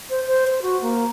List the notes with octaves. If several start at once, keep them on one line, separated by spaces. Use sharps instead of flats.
C5
C5
C5
F#4
A#3